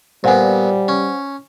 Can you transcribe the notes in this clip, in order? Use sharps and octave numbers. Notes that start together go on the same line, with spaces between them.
A#2 G3 B3 C5 F#5 G#5
C#4